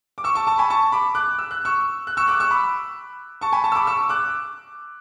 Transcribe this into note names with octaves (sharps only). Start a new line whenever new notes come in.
D6
C#6 E6
A5 C#6
A5 C#6
G#5 B5
A5 C#6
B5 D6
D6 F#6
E6
F#6
C#6 E6
F#6
C#6 E6
D6 F#6
C#6 E6
B5 D6
A5 C#6
G#5 B5
A5 C#6
E6
B5 D6
C#6 E6
D6 F#6